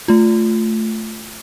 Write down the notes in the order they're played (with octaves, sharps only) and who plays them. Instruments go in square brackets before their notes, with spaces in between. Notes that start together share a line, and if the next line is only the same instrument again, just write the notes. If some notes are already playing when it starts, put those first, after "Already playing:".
[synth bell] A3 F4